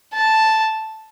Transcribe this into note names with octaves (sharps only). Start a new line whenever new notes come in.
A5